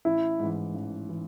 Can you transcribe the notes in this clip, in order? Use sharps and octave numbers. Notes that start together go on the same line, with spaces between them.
A1 E4
G#2 E3
A1
E3